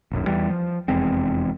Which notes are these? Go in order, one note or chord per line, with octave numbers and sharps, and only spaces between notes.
D#1 B1 F#2
E2 E3 G3
F3
F1 E2 G#3 C4